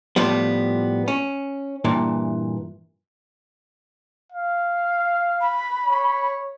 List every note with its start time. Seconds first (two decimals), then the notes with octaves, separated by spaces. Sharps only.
0.16 A2 F3 G3 B3
1.08 C#4
1.84 G2 A#2 E3
4.32 F5
5.41 B5
5.86 C#5